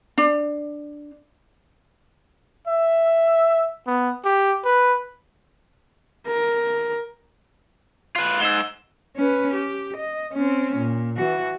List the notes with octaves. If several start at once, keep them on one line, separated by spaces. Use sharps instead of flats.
D4
E5
B3
G4
B4
A#4
F4 B4 C7
G#2 E6 E7 G7
C#4 B4
G4
D#5
C4 C#4
A#2
E3 F#4